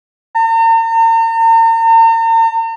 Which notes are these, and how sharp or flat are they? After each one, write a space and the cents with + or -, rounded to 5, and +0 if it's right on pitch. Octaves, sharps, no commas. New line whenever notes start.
A#5 -45